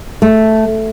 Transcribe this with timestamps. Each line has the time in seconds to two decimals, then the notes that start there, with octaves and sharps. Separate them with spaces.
0.22 A3